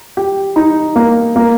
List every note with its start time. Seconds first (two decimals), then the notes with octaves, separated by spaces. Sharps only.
0.17 G4
0.56 D#4
0.96 A#3
1.36 A#3